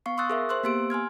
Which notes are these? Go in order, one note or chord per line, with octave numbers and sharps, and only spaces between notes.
B3 F5 C#6 C7
C6 C#6 D#6 E6 F#6 A6
G#4 A#4 E5
C5 C6 E6 F#6
A#3 B3 G4 C6 E6 D7
G#5 C6 F6 G#6